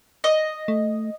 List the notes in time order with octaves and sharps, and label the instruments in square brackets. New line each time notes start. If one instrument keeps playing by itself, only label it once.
[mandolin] D#5
[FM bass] A3